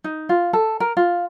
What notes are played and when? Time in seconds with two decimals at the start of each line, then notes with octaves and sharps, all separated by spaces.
0.04 D#4
0.29 F4
0.53 A4
0.80 A#4
0.97 F4